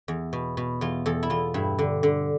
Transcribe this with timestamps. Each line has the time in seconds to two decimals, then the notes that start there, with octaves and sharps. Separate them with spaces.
0.08 E2
0.33 B2
0.57 B2
0.81 E2 F4
1.06 E2 A4
1.23 E4
1.30 E2 F4
1.54 G2 E4
1.79 D3
2.03 D3